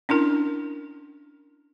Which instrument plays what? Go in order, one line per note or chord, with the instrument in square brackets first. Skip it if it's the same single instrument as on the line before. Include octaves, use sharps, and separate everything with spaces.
[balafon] C#4 D4 E4 A#4